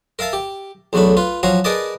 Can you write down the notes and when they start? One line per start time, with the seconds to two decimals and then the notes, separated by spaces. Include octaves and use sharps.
0.19 A#4 E5 F5 A5
0.33 G4
0.93 B1 E2 F#3 A3 D4 B5
1.17 F4 B4
1.43 F3 F#3 C#4 F5 F#5 A#5
1.64 G#4 A#4 B4 D5 D#5 A5